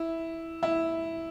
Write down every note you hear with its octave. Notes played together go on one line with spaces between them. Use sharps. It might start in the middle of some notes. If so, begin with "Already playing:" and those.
Already playing: E4
E4